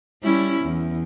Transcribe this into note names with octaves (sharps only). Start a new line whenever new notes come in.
G3 C#4 E4
E2